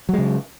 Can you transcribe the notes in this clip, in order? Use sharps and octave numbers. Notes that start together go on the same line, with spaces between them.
C#3 F#3 G#3